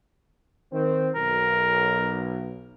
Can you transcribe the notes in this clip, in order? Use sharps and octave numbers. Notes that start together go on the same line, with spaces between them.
D#3 C4
B1 A#4